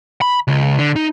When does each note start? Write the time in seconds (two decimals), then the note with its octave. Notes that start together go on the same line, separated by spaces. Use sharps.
0.21 B5
0.48 C#2
0.79 D3
0.96 D#4